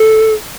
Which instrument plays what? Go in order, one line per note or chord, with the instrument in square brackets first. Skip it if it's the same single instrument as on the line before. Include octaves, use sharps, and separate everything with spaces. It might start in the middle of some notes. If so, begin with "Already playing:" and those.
Already playing: [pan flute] A4